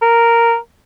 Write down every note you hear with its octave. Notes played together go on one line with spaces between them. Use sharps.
A#4